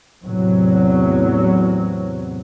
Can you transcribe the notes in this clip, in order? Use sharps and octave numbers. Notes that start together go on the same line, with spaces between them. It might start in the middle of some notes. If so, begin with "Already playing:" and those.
E2 A2 C3 F#3